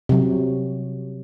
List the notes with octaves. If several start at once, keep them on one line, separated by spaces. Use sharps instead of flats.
C3 F#3